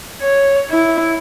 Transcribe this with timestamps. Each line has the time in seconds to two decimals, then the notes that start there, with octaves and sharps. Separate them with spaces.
0.22 C#5
0.71 E4